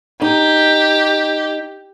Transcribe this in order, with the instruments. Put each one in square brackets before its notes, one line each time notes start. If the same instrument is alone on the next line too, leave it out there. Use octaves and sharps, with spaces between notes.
[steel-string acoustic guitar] D#4 [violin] G4